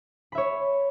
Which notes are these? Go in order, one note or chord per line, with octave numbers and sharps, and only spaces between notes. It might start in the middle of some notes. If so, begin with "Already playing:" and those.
C#5 E5 B5